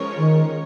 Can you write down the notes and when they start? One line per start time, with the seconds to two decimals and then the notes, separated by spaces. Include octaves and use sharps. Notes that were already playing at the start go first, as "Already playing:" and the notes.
Already playing: F3 G#3 C#4 A#4 C#5
0.16 D#3